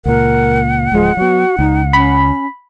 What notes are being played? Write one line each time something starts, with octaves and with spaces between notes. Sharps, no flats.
C#2 A#2 A#4 F#5
D1 F3 G#3
F#3 B3 F#4
C#2 D#4
C#4 B5